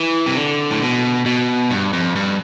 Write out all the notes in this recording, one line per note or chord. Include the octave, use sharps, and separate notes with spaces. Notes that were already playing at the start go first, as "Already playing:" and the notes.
Already playing: E3
C3
D3
A2
B2
B2
G2
F2
G2